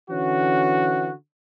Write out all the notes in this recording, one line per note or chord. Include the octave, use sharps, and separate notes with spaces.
D3 E3 C#4 F#4